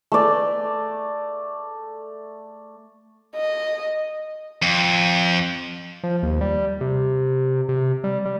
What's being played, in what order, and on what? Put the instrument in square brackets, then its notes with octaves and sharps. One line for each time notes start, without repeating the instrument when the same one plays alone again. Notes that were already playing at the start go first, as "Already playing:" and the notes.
[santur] A3 D5
[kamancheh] D#5
[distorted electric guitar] F2
[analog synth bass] F3
D#2
G3
C3
C3
G3
G3